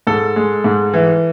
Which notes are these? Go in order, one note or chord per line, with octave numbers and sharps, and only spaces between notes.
G#2 A4
G#3
G#2
E3